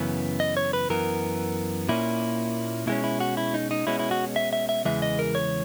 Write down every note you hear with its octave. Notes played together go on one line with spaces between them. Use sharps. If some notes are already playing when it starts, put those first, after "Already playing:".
Already playing: F#2 C#3 E3 B3
D#5
C#5
B4
F#2 E3 B3 A#4
A#2 A#3 C#4 E4
B2 G#3 C#4 E4
E4
F#4
E4
D#4
D#4
B2 G#3 C#4 E4
E4
F#4
E5
E5
E5
E2 C#3 E3 G#3 E5
D#5
A#4
C#5